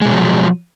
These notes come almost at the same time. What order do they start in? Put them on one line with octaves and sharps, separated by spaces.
G#3 B2 F#3 F3